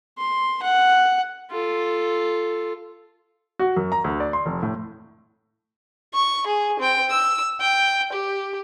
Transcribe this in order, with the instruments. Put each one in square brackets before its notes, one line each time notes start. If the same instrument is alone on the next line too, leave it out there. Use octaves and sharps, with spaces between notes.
[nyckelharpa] C6
F#5
F4 A4
[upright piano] F#4
F#2
A#5
D2
D5
C6
F1
A2
[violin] C#6
G#4
C4 G5
E6
G5
G4